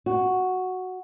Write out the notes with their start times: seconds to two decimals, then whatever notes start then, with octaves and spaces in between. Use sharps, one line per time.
0.06 F#4